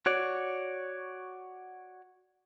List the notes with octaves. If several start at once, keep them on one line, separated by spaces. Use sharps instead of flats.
F#4 C#5 D5